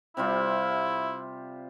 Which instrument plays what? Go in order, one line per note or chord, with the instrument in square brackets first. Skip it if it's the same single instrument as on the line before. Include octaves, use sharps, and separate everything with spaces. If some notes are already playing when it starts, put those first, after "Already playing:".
[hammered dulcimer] C3 G3 F4 [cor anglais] E4